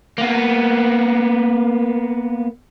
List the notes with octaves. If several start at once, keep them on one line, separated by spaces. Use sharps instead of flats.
A#3 B3